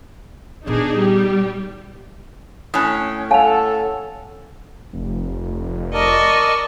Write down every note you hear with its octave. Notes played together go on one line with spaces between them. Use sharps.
A#2 B3 D4 D#4 G#4
G3 G4
A2 C#4 D#6 F#6
A4 C#5 F5 F#5 G#5 A5 F7
F1
A#4 D5 D#5 A5 C#6